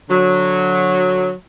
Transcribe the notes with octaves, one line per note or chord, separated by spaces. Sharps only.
D3 F#3